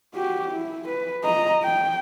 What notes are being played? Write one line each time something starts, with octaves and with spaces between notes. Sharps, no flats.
F#4 G4
E4
B4
D#5 A#5
G5